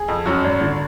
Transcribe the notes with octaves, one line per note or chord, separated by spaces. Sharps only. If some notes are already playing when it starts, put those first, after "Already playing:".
Already playing: G#4
F2
F#2 F#4
G#1
D3